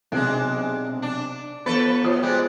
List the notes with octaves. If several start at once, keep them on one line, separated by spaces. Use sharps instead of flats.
B1 C3 G#3 D4
D4
F3 B3 A4 B4 A6
B2 F4 C5 C#5 D#6
G3 G#3